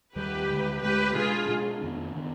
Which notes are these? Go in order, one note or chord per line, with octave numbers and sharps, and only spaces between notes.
D#2 D#3 G3 G4 B4
D2 D3 G#3
D2 D3 G#3 G4 B4
B2 G#3 D4 F4 G#4
B2 G#3 D4
F2 D#3 B3 D4
D#3 B3 D4